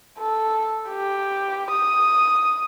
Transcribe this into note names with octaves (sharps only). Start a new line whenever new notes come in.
A4
G4
D#6